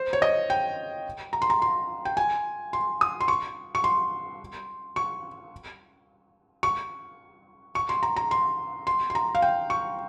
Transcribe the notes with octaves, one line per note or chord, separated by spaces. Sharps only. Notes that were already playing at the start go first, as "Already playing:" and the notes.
Already playing: C5
C#5
D#5
G5
A#5
C6
A#5
C6
G5
G#5
C6
D#6
C6
C#6
C#6
C6
C#6
C#6
C#6
C6
A#5
A#5
C6
C6
C6
A#5
F5
G5
C#6